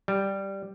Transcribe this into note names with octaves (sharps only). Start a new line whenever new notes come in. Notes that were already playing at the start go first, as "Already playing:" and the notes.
G3